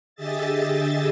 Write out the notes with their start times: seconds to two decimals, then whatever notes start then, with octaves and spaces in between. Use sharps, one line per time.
0.15 D3 G4 G#4 D#5 E5 A6